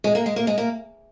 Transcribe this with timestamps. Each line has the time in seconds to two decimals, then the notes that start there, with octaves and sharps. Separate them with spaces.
0.04 G#3
0.15 A#3
0.26 G#3
0.36 A#3
0.47 G#3
0.58 A#3